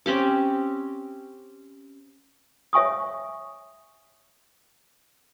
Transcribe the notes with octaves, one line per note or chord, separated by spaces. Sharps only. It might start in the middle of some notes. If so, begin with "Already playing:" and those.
C4 C#4 G4 D6
C#5 E5 G#5 C#6 D#6